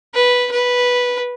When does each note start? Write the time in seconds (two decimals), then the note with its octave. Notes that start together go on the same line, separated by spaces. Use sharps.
0.14 B4
0.51 B4